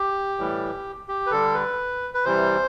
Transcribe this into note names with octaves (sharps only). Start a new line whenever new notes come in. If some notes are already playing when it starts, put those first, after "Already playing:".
Already playing: G4
A2 E3 G3
G4
B4
D3 G3 A4
B4
B4
C3 E3 G3 C5